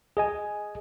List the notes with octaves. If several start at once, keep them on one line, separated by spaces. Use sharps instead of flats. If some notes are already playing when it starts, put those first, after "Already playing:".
G#4 D#5 G#5